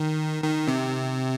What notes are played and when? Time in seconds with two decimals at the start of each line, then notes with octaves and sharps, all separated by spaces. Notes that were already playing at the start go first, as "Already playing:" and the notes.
Already playing: D#3
0.44 D#3
0.68 C3